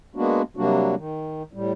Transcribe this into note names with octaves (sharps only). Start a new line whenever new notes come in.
G#3 A#3 B3 D4 F#4
C3 F#3 G3 A#3 D4 F#4
D#3
A2 G3